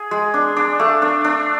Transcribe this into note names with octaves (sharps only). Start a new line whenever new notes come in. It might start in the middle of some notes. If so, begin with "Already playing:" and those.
Already playing: G#4
G#3
D4
D4
A3
D4
D4